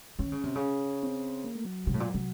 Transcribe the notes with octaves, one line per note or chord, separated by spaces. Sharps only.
D#3 C#4
C#3
C3
C#3
C4
A#3
A3
F#3
C3
A2
A#2
C3